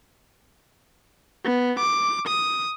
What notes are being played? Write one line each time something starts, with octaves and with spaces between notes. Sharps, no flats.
B3
D6
D#6